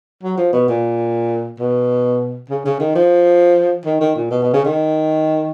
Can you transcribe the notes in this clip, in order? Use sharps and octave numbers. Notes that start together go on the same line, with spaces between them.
F#3
F3
B2
A#2
B2
C#3
C#3
D#3
F3
D#3
D#3
A#2
B2
B2
C#3
D#3